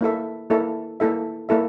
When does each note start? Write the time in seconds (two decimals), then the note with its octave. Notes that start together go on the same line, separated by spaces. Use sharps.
0.01 A#3 E4 A4 E5
0.50 A#3 E4 A4 E5
1.00 A#3 E4 A4 E5
1.49 A#3 E4 A4 E5